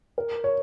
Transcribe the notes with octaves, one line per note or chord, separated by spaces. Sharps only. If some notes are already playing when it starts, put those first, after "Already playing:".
A#4
C#5